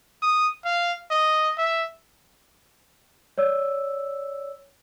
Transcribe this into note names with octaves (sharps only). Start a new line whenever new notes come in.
D#6
F5
D#5
E5
C#5 D5 E6